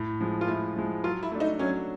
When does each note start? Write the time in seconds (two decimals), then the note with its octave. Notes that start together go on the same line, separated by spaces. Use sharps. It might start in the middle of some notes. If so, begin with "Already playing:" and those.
Already playing: A2
0.20 F3 G#3
0.41 F4
0.48 A2 E4
0.76 F3 G#3
1.04 F#3 F4
1.23 E4
1.32 A3 D4
1.40 D#4
1.59 F#3 C#4